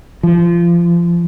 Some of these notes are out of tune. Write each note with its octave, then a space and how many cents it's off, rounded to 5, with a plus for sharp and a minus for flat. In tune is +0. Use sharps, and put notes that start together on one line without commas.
F3 -25